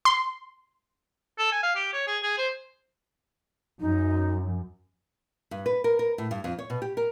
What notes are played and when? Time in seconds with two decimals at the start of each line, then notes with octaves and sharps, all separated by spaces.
0.05 C6
1.39 A4
1.52 G#5
1.63 F5
1.76 G4
1.93 C#5
2.07 G#4
2.23 G#4
2.38 C5
3.80 F#2 D#4
5.51 G2
5.66 B4
5.84 A#4
5.99 A#4
6.18 A2
6.31 G2
6.44 F2
6.59 C#5
6.70 B2
6.82 G4
6.97 A#4